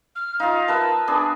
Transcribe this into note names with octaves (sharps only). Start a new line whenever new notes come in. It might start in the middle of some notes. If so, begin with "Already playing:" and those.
F6
D#4 F4 F5
A#4 B4 E5 A5
B3 D4 G#4